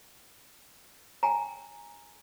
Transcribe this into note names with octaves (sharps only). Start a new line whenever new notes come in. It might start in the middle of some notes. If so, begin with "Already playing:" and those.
G5 G#5 A#5